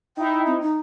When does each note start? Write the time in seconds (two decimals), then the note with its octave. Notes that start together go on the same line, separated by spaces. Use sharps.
0.17 D#4 E4 G5
0.46 C4
0.61 D#4